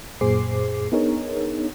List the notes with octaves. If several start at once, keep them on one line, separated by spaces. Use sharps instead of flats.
F#2 A#2 G#4 C5 D6 C7
B3 D4 D#4 G#4 A#4 C#5